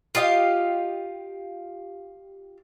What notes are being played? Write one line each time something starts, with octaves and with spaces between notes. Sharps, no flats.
F4 G4 D#5 F5